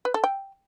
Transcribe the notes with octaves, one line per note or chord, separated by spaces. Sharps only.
B4
A4
G5